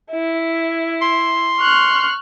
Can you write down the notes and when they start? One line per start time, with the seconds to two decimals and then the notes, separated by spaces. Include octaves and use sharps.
0.11 E4
1.02 C6
1.61 C#6 F6 F#6